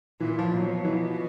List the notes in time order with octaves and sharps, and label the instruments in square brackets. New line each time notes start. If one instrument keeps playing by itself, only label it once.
[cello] A#2 [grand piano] E3
[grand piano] F3
[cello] B2 [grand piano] F#3
[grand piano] F#3
E3
F3